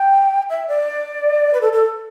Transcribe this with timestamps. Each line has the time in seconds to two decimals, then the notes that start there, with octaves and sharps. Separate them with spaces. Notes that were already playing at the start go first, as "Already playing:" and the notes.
Already playing: G5
0.50 E5
0.68 D5
1.54 B4
1.61 A4
1.73 A4